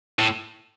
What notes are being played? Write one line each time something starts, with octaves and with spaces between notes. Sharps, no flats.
A2